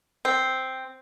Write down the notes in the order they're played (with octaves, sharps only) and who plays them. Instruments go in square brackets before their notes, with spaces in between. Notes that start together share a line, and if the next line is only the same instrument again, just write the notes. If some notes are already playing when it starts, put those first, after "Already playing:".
[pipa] C4